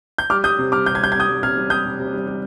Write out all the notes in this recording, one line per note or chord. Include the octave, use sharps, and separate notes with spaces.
G6
G3 D6 F6
G3 D#6 G6
C3
G3 D6 F6
C3 G6
G#6
G3 G6
C3 G#6
D#6 G6
G3
C3 F6 G#6
G3
G3 D#6 G6
C3
C3
G3
G3